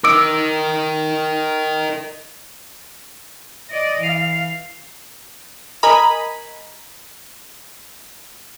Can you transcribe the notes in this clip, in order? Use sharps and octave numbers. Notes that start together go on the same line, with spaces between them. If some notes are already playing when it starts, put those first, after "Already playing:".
A#4 D#5 D6 E6 D7
D5 D#5
E3 F5
A#4 D#5 G#5 A#5 B5